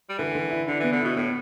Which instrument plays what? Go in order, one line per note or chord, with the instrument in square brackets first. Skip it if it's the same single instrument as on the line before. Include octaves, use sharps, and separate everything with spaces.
[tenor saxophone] G3
[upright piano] D3 [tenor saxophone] E3
[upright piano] D3
E4
[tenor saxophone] D3 [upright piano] D4
[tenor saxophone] E3 [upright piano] B3
[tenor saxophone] D3
[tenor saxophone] B2 [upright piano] E4
[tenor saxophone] A2 [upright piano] B3